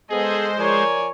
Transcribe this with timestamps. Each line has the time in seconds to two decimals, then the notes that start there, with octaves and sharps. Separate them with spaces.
0.10 G#3 B3 G#4 A4 C5 D#5
0.59 F3 A#4 C#5 D5 G#5